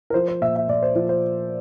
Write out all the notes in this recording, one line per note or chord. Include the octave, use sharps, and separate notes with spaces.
A#4
F3 C5
C5
A#2 E5
E5
A#2 D5
C5
F3 C5
C5